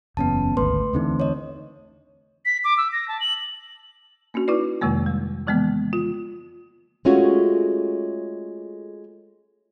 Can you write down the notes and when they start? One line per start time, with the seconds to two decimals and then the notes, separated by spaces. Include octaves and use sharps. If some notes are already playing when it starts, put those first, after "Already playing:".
0.17 F#1 E2 B3 C#4 A5
0.57 G#1 D2 A3 B4 C6
0.93 E2 D3 E3 A3 C4 D#4
1.20 C#5 D#5
2.45 B6
2.64 D6
2.78 E6
2.92 A#6
3.08 A5
3.20 F#7
4.34 A#3 C#4 D4 F#4
4.48 D#4 E4 F#4 B4 D5
4.81 F2 C3 D#3 G#3 A#3
5.06 G3
5.47 C#3 E3 F3 G#3 A#3 B3
5.93 F4
7.05 G#3 A3 C#4 F4 F#4